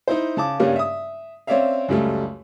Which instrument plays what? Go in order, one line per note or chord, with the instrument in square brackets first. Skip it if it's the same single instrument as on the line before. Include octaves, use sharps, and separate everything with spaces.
[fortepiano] D#4 E4 C5
C#3 A5 D6
G2 C#3 G3 A#3 C#4
E5 D#6
C4 C#4 C#5 D5 E5 F5
C#2 F#2 G3 A3